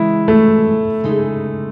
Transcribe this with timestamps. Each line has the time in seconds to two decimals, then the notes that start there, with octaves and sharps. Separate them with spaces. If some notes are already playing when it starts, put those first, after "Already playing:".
Already playing: C#3 E3 G#3 E4
0.28 A3
1.04 C#3 G#3 D#4